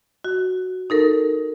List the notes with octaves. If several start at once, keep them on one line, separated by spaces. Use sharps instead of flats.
F#4
D#4 A4 A#4